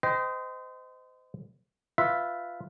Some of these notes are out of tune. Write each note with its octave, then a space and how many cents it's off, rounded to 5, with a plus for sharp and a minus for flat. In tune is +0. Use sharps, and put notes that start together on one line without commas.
C5 -35 D#5 +5 G5 +0
F4 +0 B4 +0 E5 +0